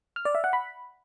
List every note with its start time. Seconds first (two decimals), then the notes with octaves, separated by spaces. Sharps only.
0.16 F6
0.25 D5
0.35 E5
0.44 F#5
0.53 B5